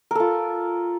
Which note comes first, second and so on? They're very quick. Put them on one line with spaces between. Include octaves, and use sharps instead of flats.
A#4 A4 F4